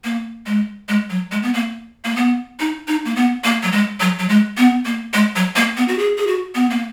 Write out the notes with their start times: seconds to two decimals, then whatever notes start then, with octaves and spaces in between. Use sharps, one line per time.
0.04 A#3
0.46 G#3
0.89 G#3
1.10 F#3
1.32 G#3
1.43 B3
1.54 A#3
2.05 A#3
2.16 B3
2.60 D#4
2.88 D#4
3.05 A#3
3.16 B3
3.44 A#3
3.63 F#3
3.72 G#3
4.00 F#3
4.19 F#3
4.29 G#3
4.58 B3
4.86 A#3
5.14 G#3
5.36 F#3
5.56 A#3
5.77 B3
5.88 F#4
5.98 G#4
6.18 G#4
6.27 F#4
6.55 B3
6.70 A#3